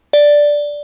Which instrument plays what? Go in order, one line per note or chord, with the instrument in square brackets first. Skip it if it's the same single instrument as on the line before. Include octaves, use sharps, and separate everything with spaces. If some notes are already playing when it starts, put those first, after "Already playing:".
[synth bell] D5